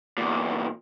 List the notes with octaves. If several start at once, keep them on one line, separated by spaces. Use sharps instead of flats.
E2 A#2